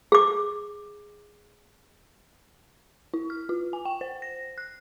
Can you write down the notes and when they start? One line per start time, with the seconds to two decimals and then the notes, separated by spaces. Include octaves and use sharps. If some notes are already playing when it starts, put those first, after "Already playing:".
0.12 G#4 D6
3.14 E4
3.30 F6
3.49 F4
3.73 G#5
3.85 G5
4.01 C5
4.22 A#6
4.58 F#6